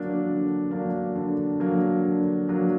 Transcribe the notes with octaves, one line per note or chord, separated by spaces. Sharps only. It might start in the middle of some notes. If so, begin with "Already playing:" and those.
Already playing: D3 F#3 A#3 D4
D3
F#3 A#3 D4
D3
F#3 A#3 D4
D3
F#3 A#3 D4